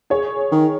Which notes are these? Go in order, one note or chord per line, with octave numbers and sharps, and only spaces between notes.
G#4 C#5
D#3